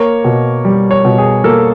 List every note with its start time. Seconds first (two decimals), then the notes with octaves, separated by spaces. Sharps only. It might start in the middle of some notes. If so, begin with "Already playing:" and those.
Already playing: A#3 C#5
0.24 B2
0.65 G3
0.91 C#5
1.05 B2
1.18 G#4
1.44 A#3 A4